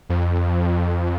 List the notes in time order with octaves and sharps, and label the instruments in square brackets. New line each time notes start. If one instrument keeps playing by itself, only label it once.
[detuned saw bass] F2